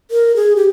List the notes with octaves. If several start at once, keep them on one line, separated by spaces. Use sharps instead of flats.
A#4
G#4
G4